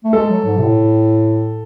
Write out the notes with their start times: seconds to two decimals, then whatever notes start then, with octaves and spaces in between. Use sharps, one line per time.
0.04 A3
0.13 G#3 A4
0.30 F#3
0.45 G#2
0.57 C3
0.62 A2